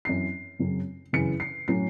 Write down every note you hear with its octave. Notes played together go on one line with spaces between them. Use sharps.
F#2 E3 C4 C7
F#2 C#3 F#3 C4
F#2 C#3 E3 C#7
C7
A2 F#3 C#4 C7